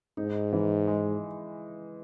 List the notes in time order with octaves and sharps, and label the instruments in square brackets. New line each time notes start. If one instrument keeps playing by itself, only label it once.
[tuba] G#2 [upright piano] D#4
[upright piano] E3
G#3